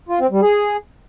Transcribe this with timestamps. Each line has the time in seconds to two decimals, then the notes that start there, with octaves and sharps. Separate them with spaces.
0.09 F4
0.20 C4
0.31 G3
0.42 G#4